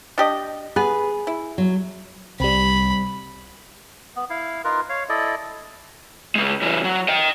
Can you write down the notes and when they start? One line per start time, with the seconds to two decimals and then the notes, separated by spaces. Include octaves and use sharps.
0.18 D4 G4 D#5
0.76 B3 G#4 B4
1.27 E4
1.58 F#3
2.40 C2 G3 C4 B5
4.16 B3
4.30 E4 F5
4.64 D#4 F4 A#4 B4
4.89 C#5 F5
5.09 E4 A4 D5 D#5
6.35 C#3 G#3
6.62 C#3 E3
6.84 F#3
7.09 D#5 G5